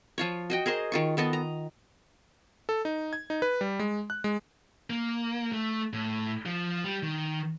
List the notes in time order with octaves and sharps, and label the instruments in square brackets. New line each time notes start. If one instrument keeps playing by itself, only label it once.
[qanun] F3 F4 C#5
F#4 D#5 G5
G#4 A#4 C5 D#5
D#3 F4 C#6
D#3 B3 A4 D#5
A#5
[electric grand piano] A4
D#4
G#6
D#4
B4
G3
G#3
F#6
G#3
[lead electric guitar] A#3
A3
A2
F3
G3
D#3